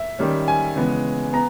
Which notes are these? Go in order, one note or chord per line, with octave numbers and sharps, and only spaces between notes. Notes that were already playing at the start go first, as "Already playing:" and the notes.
Already playing: E5
D#3 G3 C#4
G#5
C#3 E3 G#3 B3
B3 A#5